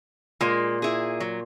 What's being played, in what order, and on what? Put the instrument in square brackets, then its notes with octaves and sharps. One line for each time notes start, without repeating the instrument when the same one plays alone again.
[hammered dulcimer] A#2 [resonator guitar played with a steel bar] G#3 A#3
[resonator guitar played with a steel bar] E4 G#4
F#3